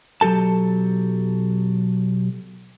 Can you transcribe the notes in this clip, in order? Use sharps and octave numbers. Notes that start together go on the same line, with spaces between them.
B1 F#3 G4 A4 A5